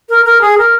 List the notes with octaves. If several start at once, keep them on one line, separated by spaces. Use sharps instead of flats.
A#4
A#4
G#4
A#4